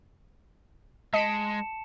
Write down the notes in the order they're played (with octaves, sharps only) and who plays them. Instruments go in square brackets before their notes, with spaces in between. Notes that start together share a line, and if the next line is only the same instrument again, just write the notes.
[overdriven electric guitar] G#3 [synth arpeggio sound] D#5 B6 D7 [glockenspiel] A5 C#7 E7